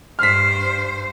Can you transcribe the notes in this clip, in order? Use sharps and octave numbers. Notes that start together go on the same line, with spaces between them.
G2 C5 F6 B6